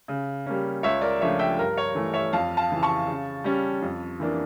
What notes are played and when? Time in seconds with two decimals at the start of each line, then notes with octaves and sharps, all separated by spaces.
0.08 C#3
0.46 G3 A#3 C#4
0.83 C#2 C#5 E5
1.02 A#4 D5
1.21 C#3 F3 A3 D4 C#5 E5
1.39 E5 G5
1.59 G2 A#4
1.77 C#5
1.95 E3 A3
2.14 C#5 E5
2.33 F2 F5 A5
2.57 F5 A5
2.70 C#3 E3
2.83 A5 C#6
3.07 C#3
3.44 G3 C#4
3.82 F2
4.20 E3 A#3 D4